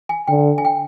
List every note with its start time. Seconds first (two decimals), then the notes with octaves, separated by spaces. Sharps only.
0.09 G#5
0.27 D3 G5
0.58 G#5
0.65 G5